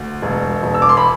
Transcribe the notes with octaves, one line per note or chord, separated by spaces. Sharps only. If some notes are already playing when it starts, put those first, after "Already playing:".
Already playing: D2
E1
E1
E6
D6
C6
B5